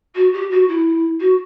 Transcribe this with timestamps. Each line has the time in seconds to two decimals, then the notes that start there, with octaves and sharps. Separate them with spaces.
0.15 F#4
0.33 G4
0.51 F#4
0.68 E4
1.20 F#4